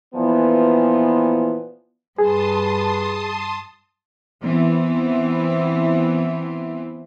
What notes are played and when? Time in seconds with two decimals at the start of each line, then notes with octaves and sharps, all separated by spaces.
0.14 A#2 E3 F3 B3
2.18 G2 G#4 B4 A5 C6 D#6
4.44 E3 B3 C4